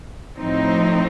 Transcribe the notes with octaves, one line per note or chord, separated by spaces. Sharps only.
A2 F3 C4 D#4